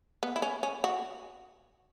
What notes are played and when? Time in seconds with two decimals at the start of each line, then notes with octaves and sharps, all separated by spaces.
0.23 B3
0.36 E4
0.42 C#4
0.63 C#4
0.84 F#4